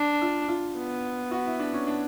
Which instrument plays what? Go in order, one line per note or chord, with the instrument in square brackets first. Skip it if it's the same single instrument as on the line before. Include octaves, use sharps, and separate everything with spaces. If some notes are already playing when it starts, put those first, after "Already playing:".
Already playing: [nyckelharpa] D4
[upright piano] F4
F4
[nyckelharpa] B3
[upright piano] F#4
E4
D4
C#4
D4